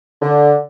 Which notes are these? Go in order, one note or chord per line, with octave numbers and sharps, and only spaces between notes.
D3